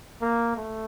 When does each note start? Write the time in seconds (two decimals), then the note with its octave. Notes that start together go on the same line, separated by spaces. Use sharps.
0.22 A#3
0.57 A3